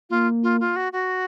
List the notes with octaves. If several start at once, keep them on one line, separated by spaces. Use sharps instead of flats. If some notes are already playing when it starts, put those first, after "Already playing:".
A#3 F4
F4
F4
F#4
F#4